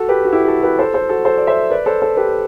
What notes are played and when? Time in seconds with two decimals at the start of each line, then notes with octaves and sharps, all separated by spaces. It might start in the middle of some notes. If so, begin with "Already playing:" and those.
Already playing: F#4 A4
0.09 G4 B4
0.25 F#4
0.32 E4 G4
0.47 F#4 A4
0.62 G4 B4
0.79 A4 C5
0.94 A4 C5
1.09 F#4 A4
1.25 A4 C5
1.37 D5
1.47 C5 E5
1.71 B4 D5
1.86 A4 C5
2.02 A4 C5
2.17 G4 B4